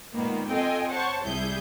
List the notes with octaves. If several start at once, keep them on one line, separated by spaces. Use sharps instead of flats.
A#2 D#3 G#3 A#3 B3
C4 F4 A4 D#5 G5 G#5
C5 C#5 F#5 A5 C#6
C2 G3 E4 G#4 G6